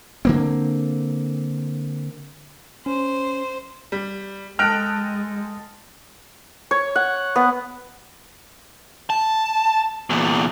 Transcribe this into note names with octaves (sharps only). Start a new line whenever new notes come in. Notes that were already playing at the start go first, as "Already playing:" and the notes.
D3 A#3 C4
C#4 C5
G3
G#3 A4 D#5 G5 F6 F#6 D7
C#5
F#5
B3
A5
E2 A#2